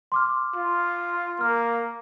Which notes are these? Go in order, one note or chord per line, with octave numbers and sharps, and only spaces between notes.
C6 D6 F6
F4
A#3 F6